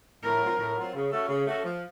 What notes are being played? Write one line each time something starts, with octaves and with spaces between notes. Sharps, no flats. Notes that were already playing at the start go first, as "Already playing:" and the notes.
A2 A#4
F#3 C4 F4
A2
F#3 C4 F4
C#3
A3 C#4 F#4 A4
C#3
A3 C#4 F#4 A4
F3